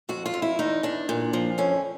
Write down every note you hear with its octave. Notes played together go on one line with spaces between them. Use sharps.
F2 F#4
F4
F2
E4
E2 D#4
E2 D4
A#2
F3
F2 C#4